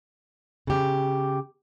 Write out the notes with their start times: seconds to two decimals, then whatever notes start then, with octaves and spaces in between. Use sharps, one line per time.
0.67 C#3 G4